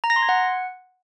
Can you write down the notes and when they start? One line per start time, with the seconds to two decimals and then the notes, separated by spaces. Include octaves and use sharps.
0.04 A#5
0.10 A#6
0.16 C6
0.22 G#6
0.29 F#5